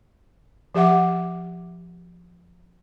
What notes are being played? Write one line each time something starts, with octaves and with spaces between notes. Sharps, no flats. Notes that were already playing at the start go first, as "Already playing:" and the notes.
F3 G4 E5 F#5 D6